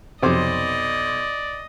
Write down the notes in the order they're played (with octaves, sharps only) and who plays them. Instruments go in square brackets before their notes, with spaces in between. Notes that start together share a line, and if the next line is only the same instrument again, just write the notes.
[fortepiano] B1 C5 D6 [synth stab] F2 C3 [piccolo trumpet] D5 [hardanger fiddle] D#5